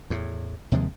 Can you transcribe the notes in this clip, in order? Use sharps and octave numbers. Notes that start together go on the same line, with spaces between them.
E2 A2
D#2 C3 F3 G#3